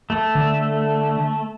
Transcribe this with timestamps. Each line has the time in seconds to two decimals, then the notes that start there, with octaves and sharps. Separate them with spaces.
0.10 A3
0.35 D3